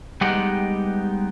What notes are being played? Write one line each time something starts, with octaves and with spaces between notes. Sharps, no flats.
G3 G#3 B3 D#4 G4 F#5